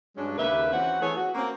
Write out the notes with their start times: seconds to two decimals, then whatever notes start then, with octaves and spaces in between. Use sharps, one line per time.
0.17 G2 F#3 G#3 C#4 D4
0.37 D#2 C#3 A#3 G4 B4 E5
0.72 E3 C4 C#4 F#4 F#5
1.01 E3 A3 B3 G#4 A4 C#5
1.16 F#4
1.35 A#3 C4 C#4